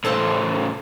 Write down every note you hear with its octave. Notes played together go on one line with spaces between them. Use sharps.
A2 C#3 A4 C5 A5